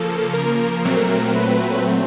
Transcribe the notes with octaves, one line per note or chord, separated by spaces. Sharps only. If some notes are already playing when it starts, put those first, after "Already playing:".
Already playing: C#3 F3 A#3 A4
A#4
A#2 F#3 A3 C4 A#4
B4